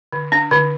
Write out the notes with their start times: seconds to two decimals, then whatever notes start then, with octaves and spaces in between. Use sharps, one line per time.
0.12 D3
0.32 D4
0.51 D3